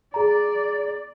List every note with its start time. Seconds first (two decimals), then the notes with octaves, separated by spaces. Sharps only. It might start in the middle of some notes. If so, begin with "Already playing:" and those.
0.14 G#4 D5 A#5